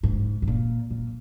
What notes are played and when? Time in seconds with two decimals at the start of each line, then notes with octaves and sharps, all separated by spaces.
0.03 G#2
0.42 G#2
0.48 A#2
0.90 A#2